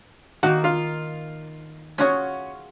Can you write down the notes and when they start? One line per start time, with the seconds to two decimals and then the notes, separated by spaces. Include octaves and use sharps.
0.43 D#3 A#3 D#4 F#4
0.64 F4
1.98 C#4 F4 F#4 G#4 C#5